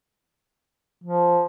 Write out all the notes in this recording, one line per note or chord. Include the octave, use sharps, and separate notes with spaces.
F3